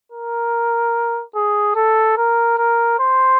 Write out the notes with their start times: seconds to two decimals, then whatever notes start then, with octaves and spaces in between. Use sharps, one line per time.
0.12 A#4
1.35 G#4
1.75 A4
2.17 A#4
2.58 A#4
2.99 C5